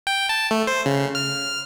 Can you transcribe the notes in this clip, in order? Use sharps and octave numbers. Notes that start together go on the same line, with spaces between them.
G5
A5
A3
C5
C#3
F6